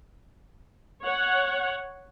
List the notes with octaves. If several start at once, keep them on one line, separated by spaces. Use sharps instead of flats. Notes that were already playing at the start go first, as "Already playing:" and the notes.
C#5 F#5